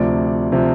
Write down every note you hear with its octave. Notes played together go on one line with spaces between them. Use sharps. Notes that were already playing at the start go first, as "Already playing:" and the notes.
Already playing: D2 C3 F3 D5
C3 F3